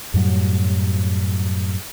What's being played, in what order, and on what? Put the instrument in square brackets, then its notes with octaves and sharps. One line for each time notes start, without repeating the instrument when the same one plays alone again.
[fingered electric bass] F#2 A2 F#3 G3